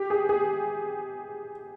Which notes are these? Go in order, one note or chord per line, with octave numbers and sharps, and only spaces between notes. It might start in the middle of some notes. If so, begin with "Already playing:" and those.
Already playing: G4
G#4
G#4